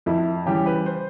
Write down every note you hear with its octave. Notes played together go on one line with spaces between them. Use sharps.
F2 E4
C#3 E3 G3 G4
B4
C5